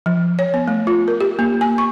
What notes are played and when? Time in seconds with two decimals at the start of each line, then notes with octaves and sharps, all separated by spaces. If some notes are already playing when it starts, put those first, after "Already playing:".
0.06 F3
0.39 C#5
0.54 B3
0.68 A3
0.87 F4
1.08 A#4
1.21 G4
1.39 A#3
1.61 G#5
1.78 C#6